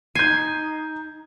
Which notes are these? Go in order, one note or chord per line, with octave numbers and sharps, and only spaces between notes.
D#4 G#5 G6 C7